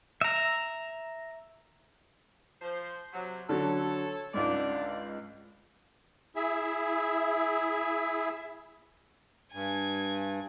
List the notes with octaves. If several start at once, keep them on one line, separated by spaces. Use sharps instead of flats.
E5 A#5
F3 C5
C3 F#3
D3 F#3 A4 C#5
C#2 G#2 D3 D5
E4 G#4 E5
G2 G#5